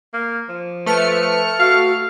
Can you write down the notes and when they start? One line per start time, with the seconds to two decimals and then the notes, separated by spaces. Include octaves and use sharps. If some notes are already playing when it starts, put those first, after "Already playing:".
0.14 A#3
0.49 F3
0.86 A3 B4 F6 C#7
1.60 F#4 F5